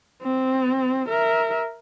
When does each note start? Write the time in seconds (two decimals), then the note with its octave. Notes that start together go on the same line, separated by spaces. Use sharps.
0.22 C4
1.09 A#4 E5